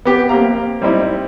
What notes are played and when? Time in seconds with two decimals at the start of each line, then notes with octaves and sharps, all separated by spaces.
0.05 B3 G4
0.29 A#3 C4 G4 F5 A#5
0.82 G3 C4 D#4 E4